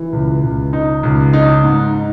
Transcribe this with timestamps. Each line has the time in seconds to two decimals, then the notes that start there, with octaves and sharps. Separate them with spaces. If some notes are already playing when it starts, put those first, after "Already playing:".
Already playing: E3
0.13 C#2
0.43 C#2
0.73 D#4
1.03 C#2
1.33 D#4
1.63 G#2